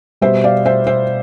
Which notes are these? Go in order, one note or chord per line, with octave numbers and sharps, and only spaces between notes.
B2 G3 B3 C5 E5
D5 F5
C5 E5
C5 E5